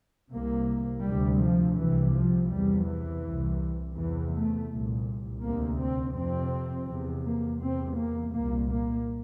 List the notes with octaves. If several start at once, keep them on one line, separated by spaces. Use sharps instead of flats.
C2 C3 A#3
D2 C3 G3
F3
C2 C3 E3
F3
E2 C3 G3
E3
C2 C3
E2 C3 E3
A3
C2 A#2
D2 C3 A#3
C4
F2 C3 C4
E2 C3
A#3
E2 C3 C4
A#3
C2 A#2 A#3
A#3